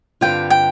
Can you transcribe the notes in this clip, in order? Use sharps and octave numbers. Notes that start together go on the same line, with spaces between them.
G2 D3 G3 C4 F4 G5
G5